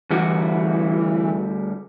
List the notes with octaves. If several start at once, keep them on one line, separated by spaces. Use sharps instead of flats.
D2 E3 G3 F#4